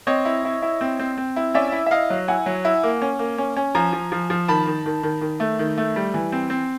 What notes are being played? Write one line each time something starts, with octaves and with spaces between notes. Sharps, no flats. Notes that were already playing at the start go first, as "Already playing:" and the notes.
C4 C#5 D#5
E4
E4
E4
C4
C4
C4
E4
C#4 D5 E5
E4
E5
E4 D#5 F5
F#3
E4 F#5 G#5
F#3
E4
A#3
C#4
A#3
C#4
C#4
F3 G#5 A#5
F3
F3
F3
D#3 A5 B5
D#3
D#3
D#3
D#3
A3
D#3
A3
G3
E3
C4
C4